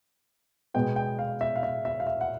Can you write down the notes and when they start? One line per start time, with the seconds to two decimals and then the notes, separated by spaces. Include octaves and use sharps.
0.74 B2 G#3 B3 G5
0.96 G5
1.19 F5
1.41 E5
1.56 F5
1.63 E5
1.85 E5
2.00 F5
2.07 E5
2.21 F#5